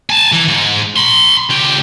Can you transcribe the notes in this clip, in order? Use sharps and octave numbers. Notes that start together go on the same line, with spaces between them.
G#5 A5
E3
G#2
B5 C6
C#2 G4